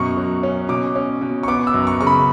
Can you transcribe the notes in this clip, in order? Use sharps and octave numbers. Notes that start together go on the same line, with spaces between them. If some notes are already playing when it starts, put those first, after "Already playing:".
Already playing: F#2 B2 C#6
F#3
C#4
B2 D6
C#4
B2
C#6
B3 D6
E6
F#2
C#6
C#3 C#6
B5